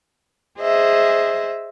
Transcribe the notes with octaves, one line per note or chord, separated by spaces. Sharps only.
G#4 C5 D#5 E5